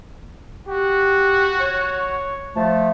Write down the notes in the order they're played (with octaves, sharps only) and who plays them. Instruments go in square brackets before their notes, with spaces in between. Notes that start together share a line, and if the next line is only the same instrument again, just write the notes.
[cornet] F#4 [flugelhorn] G4
[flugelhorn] C#5
[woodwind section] F3 A3 [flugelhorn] A5